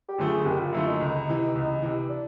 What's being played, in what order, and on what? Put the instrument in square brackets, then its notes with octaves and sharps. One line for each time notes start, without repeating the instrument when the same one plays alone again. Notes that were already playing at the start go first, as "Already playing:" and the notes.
[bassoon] G4
[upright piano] F#2 D3 F3 A3
[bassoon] G#4
[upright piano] F#1 [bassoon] G4
[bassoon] F4
[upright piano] F#2 D3 F3 A3 [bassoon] E4
[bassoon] D#4
[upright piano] C#2
C3 E3
C#2
C3 E3
[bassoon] D4